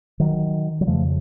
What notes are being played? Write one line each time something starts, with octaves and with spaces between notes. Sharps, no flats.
D#3 F#3
F#3
F2 C#3 F3 A3